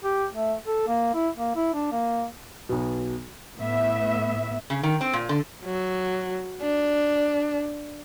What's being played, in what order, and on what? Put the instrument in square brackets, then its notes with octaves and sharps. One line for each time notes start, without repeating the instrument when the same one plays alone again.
[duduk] G4
A3
A4
A#3
E4
A#3
E4
D4
A#3
[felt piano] B1 B2
[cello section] A2 B3 E5
[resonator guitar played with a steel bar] C#3
D#3
C4
A#2
D3
[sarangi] F#3
D4